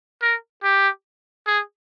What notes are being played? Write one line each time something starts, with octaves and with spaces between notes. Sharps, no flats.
A#4
G4
G#4